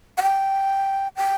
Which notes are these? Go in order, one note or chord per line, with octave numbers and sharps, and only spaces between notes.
F#5
G5
G5